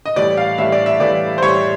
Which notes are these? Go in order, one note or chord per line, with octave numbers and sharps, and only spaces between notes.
D#5
A2 E3 G3 D5
F5
A2 E3 G3 E5
D5
E5
A2 E3 G3 D5
C5
A2 E3 G3 C#5